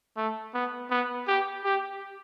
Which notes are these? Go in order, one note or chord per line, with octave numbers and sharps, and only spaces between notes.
A3
B3
B3
G4
G4